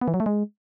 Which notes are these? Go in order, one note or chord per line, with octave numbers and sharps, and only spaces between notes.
B3
E3
F#3
A3
G#3